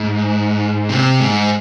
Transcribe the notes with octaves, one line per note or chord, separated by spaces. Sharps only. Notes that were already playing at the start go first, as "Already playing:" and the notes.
Already playing: G#2
C3
G#2